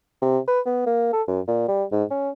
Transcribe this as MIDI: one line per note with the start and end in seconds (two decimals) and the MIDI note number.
0.22 0.38 48
0.48 0.60 71
0.66 0.84 59
0.86 1.10 58
1.13 1.22 69
1.28 1.40 42
1.48 1.65 46
1.68 1.84 55
1.92 2.04 44
2.11 2.30 61